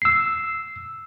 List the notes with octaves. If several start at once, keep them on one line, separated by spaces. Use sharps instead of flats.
E6 C7